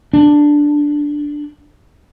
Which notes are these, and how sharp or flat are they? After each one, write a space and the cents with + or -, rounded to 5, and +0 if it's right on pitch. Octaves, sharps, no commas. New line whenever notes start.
D4 +0